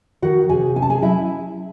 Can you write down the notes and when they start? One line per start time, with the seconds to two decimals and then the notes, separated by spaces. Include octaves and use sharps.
0.22 D#3 F#4 F#5
0.49 C3 G#4 G#5
0.76 C#4 G#5
0.82 A5
0.90 G#4 G#5
1.02 F#3 E4 E5